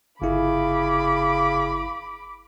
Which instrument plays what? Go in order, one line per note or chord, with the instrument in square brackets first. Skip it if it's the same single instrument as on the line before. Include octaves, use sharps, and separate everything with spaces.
[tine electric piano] G1 E4 [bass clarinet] C#3 [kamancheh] B5 D6